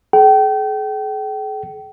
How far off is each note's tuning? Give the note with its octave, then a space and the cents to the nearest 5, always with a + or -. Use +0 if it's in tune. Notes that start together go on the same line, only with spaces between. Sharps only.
G#4 +45 G5 -30